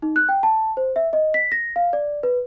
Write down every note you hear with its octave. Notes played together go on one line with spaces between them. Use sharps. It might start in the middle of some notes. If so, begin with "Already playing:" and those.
D#4
F#6
G5
A5
C5
E5
D#5
B6
A#6
F5
D5
B4